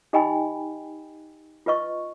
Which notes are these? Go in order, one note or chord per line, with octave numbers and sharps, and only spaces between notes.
D#4 G4 D#5 G5 G#5 B5
F4 B4 D#5 C#6